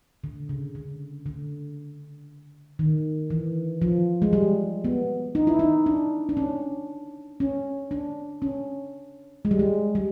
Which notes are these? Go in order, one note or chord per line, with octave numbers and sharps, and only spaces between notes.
D3
C#3
D3
D3
D#3
E3
F3
G#3
G3
B3
D#4
E4
D#4
D4
D4
C#4
C#4
D4
C#4
G#3
G3
G#3
G3